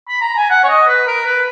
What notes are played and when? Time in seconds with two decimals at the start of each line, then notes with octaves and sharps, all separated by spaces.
0.08 B5
0.21 A#5
0.37 G#5
0.50 F#5
0.64 C#5
0.69 D#5
0.88 B4
1.07 A#4
1.26 B4